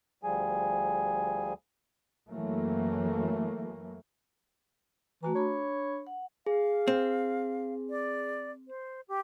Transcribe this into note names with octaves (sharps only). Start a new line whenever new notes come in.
D2 F3 G3 G#4 G#5
F#2 E3 F#3 A3 A#3
E3 A3 F#4 A#5
D4 C#5 B5
F#5
G#4 F5
C4
D5
C5
G4